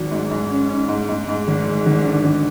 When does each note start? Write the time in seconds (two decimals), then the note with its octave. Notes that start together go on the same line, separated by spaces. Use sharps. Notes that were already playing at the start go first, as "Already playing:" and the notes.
Already playing: G#1 F#3
0.11 G#2
0.31 G#2
0.50 C#4
0.69 C#4
0.89 G#2
1.09 G#2
1.28 G#2
1.47 G#1
1.67 G#3
1.86 G#1
2.05 D3
2.24 G#1